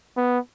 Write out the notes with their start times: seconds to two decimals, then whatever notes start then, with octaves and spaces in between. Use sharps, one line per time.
0.17 B3